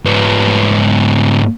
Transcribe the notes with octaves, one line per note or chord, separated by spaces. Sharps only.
G#2 B3